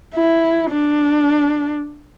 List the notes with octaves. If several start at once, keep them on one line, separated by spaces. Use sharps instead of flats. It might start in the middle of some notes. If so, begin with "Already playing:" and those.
E4
D4